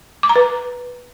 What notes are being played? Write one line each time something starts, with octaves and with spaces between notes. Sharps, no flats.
D6
A#5
B4